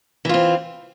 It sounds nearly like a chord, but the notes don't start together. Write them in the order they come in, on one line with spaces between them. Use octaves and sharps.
E3 F4 C4